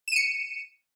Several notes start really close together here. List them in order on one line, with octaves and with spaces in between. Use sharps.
E7 D#7 C#7